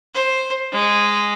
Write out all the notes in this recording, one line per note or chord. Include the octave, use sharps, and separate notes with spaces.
C5
G#3